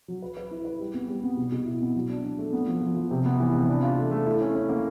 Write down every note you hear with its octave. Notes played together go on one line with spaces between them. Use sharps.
F#3
B4
B4
E4
B4
G3
B3
G3
B3
B2
B2
E4
B3
F#3
D4
D4
A3
B3
F3
F3
F3
C3
B3
E3
C3
D4
F4
A3
A3
E4
C#4
C#4
A#3